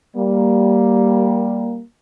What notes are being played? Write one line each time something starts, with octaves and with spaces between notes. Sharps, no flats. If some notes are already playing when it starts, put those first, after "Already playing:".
G3 A#3